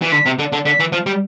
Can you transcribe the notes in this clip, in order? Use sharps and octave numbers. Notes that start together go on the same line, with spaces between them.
E3
D3 B6
C3
D3
D3
D3 B6
E3
F3
G3